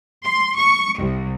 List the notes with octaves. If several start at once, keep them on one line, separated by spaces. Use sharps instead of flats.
C6
C#6
C2